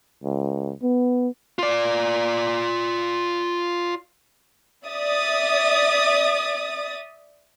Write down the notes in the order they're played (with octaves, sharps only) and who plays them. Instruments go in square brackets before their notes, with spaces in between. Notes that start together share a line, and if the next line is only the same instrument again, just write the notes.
[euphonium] C#2
B3
[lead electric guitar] F4 D5
[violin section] D5 E5 D#6 A6